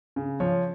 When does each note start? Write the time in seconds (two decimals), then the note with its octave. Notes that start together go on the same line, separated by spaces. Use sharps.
0.16 C#3
0.40 F3 C#5